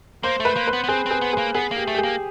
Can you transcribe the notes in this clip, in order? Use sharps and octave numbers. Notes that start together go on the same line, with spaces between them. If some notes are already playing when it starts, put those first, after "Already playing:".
A#3 C5
A3
B4
A#3
B4
B3
B3
C4 G#4
C4 G#4
B3
A#3 G#4
B3 G#4
A#3
G4
A3
G4
G#4
A#3